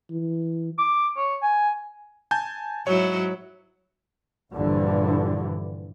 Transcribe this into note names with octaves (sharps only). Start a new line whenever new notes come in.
E3
D6
C#5
G#5
G#5 A5 G6
G#2 F#3 E4 C#5
A#1 G2 D3 E3